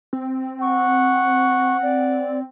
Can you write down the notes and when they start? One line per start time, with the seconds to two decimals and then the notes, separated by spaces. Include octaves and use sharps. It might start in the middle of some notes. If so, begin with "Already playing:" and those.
0.13 C4
0.61 F#5 C#6
1.83 D5